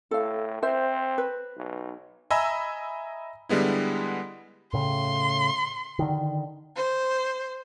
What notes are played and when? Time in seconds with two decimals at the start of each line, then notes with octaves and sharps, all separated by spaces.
0.11 A2 A4 F5
0.62 C4 C5 E5
1.18 B4
1.58 B1
2.31 D#5 E5 G#5 A#5 B5 E6
3.49 D3 G3 G#3 B3 E4
4.73 A2 C#3 C6
5.99 D3 D#3
6.75 C5